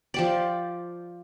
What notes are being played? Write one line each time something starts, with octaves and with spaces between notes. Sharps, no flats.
F3 G4 D5